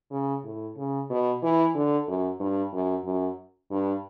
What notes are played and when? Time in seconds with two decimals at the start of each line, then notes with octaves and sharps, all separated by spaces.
0.11 C#3
0.44 A2
0.77 C#3
1.10 B2
1.42 E3
1.75 D3
2.08 F#2
2.40 G2
2.73 F#2
3.05 F#2
3.71 G2